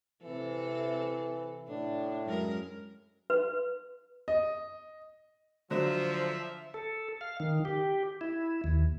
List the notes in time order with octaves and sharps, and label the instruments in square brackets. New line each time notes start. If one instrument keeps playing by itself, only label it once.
[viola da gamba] C3 C4 A4 [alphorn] E3
[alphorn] A2 [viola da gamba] D4
[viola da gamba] F#2 G#3 A#4
[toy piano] B4
[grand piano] D#5
[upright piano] D3 F#3 [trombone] F3 [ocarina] C5 [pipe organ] E5
[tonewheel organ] A4
F5
D#3
G4
E4
D#2